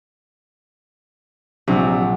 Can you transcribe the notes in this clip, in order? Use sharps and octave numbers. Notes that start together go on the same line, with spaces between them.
A#1 C3 F#3 D4